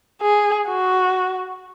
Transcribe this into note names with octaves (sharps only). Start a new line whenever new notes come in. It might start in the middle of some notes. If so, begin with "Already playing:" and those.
G#4
F#4